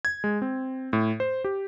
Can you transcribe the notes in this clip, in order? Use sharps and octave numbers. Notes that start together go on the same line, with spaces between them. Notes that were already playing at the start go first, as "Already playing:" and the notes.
G#6
G#3
C4
A2
C5
G4